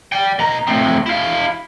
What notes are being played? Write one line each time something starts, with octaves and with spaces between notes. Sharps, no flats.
D5 G5
B2 A#5
A3 C4
E4 F5